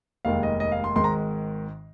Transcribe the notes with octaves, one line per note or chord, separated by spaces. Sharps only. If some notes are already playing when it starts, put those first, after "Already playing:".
F1 D#2 D#3 G#3 F5
D#5
D#5
F5
C6
G#1 G#2 D#3 G#3 C6
A#5